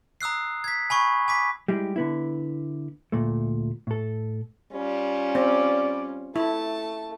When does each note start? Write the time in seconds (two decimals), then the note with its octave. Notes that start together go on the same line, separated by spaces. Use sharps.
0.21 A#5 D#6 E6 F#6 C7
0.64 G#6 B6
0.90 G#5 B5 C#6 G#6
1.28 G#5 D6 B6
1.68 G3 G#3 E4 G4
1.96 D3 B3 E4
3.12 D2 A#2 A3
3.87 A2 A4
4.72 G3 C#4 F4
5.35 C4 D5
6.36 A3 E4 A5